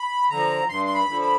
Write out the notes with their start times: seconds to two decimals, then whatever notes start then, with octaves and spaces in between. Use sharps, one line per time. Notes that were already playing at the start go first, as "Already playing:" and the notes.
Already playing: B5
0.30 D3 F3 A#5
0.69 G2 C6
0.86 C6
0.94 B5
1.09 D3 F3
1.21 B5